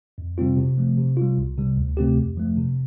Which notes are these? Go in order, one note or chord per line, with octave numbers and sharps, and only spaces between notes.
F2
C3 G3 C4 F4
C3
F3 A3
C3
G3 F4
C2
C3 G3
D2
C3 A3 C4 G4
F2
F3 A3
C3